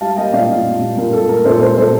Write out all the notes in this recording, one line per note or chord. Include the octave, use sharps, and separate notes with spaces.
G3 F5 A5
A#3 D#5 G5
A#2 D5 F5
A#2
A#2
G3
A#2 A#4
A#2 A4
A#3 A#4
A#2 A4 C5
G3 A4 C5
A#2 A4 C5